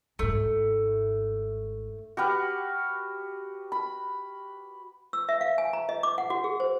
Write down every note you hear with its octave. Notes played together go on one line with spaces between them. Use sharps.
G#1 G#2 A3
F#4 G4 B4 F5
B5
E6
E5
F5
G#5
A#5
D#5
D6
F#5
F#4
G#4
C5